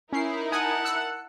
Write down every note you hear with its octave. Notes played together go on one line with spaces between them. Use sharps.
C#4 D#4 E4 A#4 C7
F#5 G#5 A5 D#6
E6 F#6 C#7